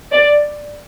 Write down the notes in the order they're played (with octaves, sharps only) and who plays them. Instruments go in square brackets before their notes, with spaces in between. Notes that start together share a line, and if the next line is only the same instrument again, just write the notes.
[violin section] D5